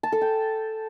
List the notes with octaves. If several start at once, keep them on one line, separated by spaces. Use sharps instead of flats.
A5
A4
G5